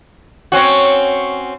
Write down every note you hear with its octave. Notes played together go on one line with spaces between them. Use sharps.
C4 C#4 F#4